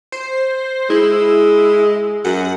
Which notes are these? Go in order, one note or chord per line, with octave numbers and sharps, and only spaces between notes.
C5
G#3 E4
F#2 F#5